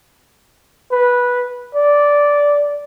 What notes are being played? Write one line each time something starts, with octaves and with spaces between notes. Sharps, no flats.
B4
D5